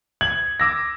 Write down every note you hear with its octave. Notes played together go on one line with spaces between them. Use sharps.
G#6 F#7
D6 E6 A#6